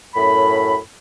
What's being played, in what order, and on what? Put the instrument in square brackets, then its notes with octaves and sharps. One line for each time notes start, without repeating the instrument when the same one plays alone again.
[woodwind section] F#2 A2 B5